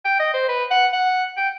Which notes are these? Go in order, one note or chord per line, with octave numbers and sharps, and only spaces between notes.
G5
D#5
C5
B4
F#5
F#5
G5